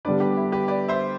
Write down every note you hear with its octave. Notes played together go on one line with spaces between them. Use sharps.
D3 G3 B3 D4 B4 D5
G4 B4
E4
G4 B4
B4 D5
C5 E5